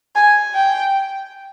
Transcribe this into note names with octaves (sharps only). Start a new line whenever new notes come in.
G#5
G5